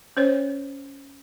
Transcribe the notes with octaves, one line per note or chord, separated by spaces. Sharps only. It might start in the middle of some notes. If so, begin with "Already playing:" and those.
C#4 C5 C#5